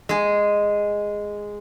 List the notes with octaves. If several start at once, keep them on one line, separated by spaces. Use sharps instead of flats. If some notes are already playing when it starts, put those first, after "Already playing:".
G#3 G#4